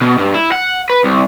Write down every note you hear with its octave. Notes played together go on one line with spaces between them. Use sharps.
B2
G2
E4
F#5
B4
C2